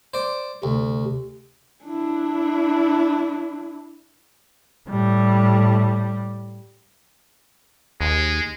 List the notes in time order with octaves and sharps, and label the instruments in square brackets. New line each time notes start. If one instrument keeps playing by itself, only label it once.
[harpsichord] C5 D5
[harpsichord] D2 [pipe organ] C3
[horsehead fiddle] D4 E4
[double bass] A2 G3
[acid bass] D#2 [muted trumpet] G#3